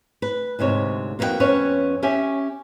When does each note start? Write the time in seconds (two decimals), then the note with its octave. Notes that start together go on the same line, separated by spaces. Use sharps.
0.22 B4
0.59 D2 G#2 C3 C#5
1.19 F2 A#3 B3 E4 F#4 G5
1.40 F2 B3 C#4 B4 C#5
2.03 C#4 G4 E5 G#5